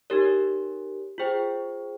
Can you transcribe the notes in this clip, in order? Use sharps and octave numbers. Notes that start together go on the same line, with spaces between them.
D#4 G4 A#4 C#5
F4 G#4 C5 G5